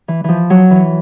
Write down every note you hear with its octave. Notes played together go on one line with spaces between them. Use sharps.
E3
E3 F3
F#3
E3